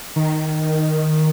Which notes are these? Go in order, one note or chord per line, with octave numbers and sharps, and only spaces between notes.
D#3